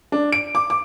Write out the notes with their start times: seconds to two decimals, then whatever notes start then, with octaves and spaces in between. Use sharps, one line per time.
0.12 D4
0.32 D7
0.55 D6
0.70 D6